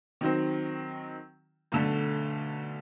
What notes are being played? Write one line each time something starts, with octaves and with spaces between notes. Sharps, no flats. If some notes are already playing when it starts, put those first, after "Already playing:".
D#3 F#3 C4
B1 D3 A3